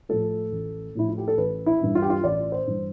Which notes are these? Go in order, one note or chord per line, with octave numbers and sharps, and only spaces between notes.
A2 F3 A3 A4
A1
A2 F3 A3 E4
F4
G4
A4
A1 B4
E4
G2 E3
F4
G4
F4
A1 D5
C5
G2 E3